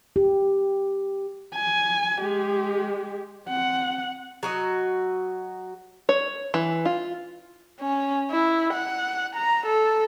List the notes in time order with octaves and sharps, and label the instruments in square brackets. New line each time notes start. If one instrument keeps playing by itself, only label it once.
[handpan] G4
[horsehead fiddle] G#5
G#3 G4
C4 F#5
[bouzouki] F#3 F#4 D#5
[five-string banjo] C#5
E3
F4
[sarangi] C#4
E4
F#5
A#5
A4